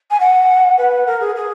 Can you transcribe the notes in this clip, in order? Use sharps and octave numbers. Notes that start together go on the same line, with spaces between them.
G#5
F#5
B4
A#4
G#4
G#4